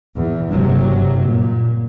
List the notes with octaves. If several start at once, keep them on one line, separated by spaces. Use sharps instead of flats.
E2
F#1 G2 C3 F#3
A#2